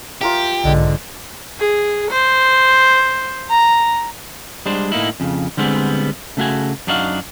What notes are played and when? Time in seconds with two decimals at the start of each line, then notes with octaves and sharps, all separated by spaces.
0.21 F4 G4 A#4 E5
0.64 B1 G#2 D3 D#5
1.60 G#4
2.11 C5
3.50 A#5
4.66 G3 G#3 D4 C5
4.92 A2 A#3 D#4 E4
5.20 F2 C#3
5.57 D3 G3 G#3 B3 C4
6.37 C#3 A3 F#4 G#5
6.87 F#2 D4 D#4 F#4 G4 F5